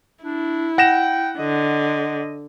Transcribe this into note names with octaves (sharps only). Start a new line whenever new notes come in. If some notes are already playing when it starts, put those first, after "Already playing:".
D4 E4
F#5 G5 A#6 E7
D3 D#5